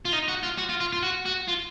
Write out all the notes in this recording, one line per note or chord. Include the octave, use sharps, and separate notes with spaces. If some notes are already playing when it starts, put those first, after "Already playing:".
F4
D#4
F#4
F4
F#4
F4
F4
F4
F#4
F#4
F4